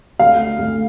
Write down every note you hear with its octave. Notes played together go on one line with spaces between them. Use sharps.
D2 F5
D2